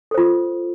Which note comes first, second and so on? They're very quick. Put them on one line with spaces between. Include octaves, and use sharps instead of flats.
A4 C5 F4